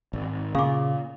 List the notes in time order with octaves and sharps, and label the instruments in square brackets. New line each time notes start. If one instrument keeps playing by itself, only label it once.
[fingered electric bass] G#1
[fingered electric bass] A#2 [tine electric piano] C#3 [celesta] F5 D6